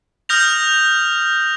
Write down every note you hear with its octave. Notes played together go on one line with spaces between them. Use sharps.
D#6 F6 G6 A#6 F7